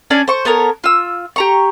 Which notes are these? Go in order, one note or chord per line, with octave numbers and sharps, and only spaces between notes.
C#4 D4 D5 G#5
C5 C#6
B3 A4 A#4 C#5
F4 E6
G4 A#5 C#6